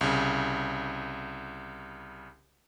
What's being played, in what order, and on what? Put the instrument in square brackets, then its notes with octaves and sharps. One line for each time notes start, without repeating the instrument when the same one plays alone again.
[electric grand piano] C2 C#3